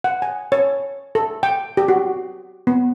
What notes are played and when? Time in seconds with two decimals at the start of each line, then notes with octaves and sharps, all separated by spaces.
0.04 F#5
0.22 G#5
0.52 C#5
1.15 A4
1.43 G5
1.77 G4
1.88 F#4
2.67 B3